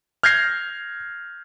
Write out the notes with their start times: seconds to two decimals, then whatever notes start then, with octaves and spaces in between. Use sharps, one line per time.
0.23 F6 G6 G#6 A#6 C7